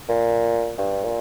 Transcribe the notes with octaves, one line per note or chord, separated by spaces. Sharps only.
A#2
G2
A#2